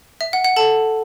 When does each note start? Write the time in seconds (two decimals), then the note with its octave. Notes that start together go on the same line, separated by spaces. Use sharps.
0.21 E5
0.33 F#5
0.44 F#5
0.56 A4 A5